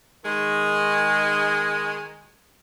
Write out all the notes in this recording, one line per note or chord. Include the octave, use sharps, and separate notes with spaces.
D#3 G#3